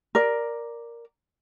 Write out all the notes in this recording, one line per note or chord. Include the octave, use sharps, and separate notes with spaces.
A#4 D5